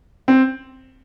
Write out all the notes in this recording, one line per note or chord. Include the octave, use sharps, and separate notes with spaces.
C4